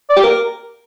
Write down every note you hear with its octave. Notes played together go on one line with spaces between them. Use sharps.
D5
G4
A#4